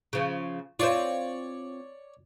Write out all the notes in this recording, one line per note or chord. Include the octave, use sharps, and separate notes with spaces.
C#3 F3
C4 F4 C#5 D5